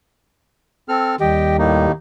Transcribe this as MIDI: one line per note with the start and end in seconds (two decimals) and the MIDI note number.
0.89 1.16 60
0.89 1.16 69
0.89 1.16 89
1.20 1.87 39
1.20 1.87 55
1.20 1.57 67
1.20 1.57 75
1.20 1.57 79
1.58 1.92 45
1.58 1.92 58
1.58 1.92 63